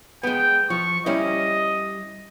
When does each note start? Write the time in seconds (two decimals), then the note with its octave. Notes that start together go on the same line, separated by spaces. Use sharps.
0.23 G#3 B3 G5
0.70 F3 C#6
1.06 G3 C#4 E4 D#5